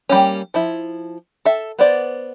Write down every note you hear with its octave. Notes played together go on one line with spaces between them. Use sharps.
G3 A#3 C#4
F3 E4
A4 E5
B3 C5 D5